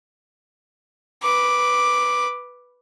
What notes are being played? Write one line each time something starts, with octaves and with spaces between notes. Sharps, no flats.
B4 D6